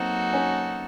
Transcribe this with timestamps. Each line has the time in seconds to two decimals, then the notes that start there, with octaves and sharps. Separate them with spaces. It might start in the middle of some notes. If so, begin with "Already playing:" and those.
Already playing: F#3 A#3 C4 D#4 F#4 A4
0.33 C#4